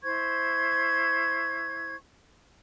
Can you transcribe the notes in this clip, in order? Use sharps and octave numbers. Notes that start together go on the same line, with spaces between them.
E4 C5 C#6 G#6